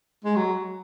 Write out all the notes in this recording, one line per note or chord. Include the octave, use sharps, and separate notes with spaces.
G#3
F#3